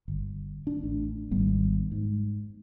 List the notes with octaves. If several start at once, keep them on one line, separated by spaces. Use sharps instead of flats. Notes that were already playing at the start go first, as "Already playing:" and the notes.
G1
D4
A1
G#1 G3 B3
G#2